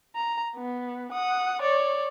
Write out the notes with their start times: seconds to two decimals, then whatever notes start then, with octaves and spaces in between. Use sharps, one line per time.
0.16 A#5
0.56 B3
1.12 F#5 D#6
1.62 C#5 D5